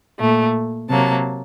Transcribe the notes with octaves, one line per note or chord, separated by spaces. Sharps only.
A#2 A3
C3 F#3 A#3 A5